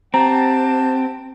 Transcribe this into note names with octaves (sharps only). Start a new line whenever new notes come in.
C4 G4 F#5 A5 A#5